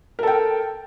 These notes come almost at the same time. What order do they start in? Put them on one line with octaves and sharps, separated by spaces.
A#4 A4 G5